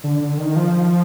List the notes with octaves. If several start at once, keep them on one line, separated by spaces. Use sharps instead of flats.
D3
D3
D#3
F3
F3